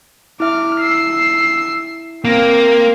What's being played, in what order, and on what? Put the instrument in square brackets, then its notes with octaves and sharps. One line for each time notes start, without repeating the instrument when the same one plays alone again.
[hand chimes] E4 E5 [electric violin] D6 F6
[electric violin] E6 C7
[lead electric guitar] A#3 [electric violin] C4